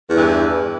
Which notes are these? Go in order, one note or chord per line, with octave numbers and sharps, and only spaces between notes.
E2 G2 E3